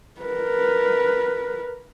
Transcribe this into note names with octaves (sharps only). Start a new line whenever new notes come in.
A#4 B4